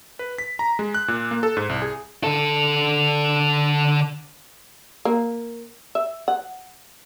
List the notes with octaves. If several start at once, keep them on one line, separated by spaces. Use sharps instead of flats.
B4
B6
A#5
G#3
F#6
A#2
A#3
A4
G#2
C2
G#4
D3 A4
A#3
E5
F#5